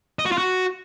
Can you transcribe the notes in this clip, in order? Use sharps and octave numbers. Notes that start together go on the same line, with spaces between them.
D#5
F#4
F4
F#4